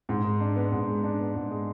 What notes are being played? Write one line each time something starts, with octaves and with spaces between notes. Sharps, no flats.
G#2
G#3
D4
B3
G#2
G#3
D4
B3
G#2
G#3